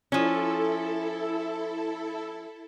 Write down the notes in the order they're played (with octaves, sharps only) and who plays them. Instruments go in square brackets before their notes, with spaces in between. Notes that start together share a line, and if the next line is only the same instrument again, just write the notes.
[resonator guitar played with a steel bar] F3 C#4 [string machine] E4 A4